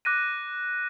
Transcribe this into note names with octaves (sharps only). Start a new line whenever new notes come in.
D6 F#6 A#6 D#7